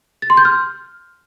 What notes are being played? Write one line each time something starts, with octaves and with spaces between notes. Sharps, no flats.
A6
C6
G6
F6